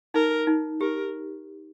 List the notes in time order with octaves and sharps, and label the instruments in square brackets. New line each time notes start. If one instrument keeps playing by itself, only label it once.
[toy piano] D#4 [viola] A#4
[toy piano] D#4
[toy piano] G4 [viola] A#4